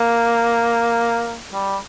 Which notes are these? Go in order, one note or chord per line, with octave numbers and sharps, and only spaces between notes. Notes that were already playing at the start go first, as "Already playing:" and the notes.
Already playing: A#3
G3